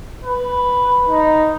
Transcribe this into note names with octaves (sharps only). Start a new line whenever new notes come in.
B4
D#4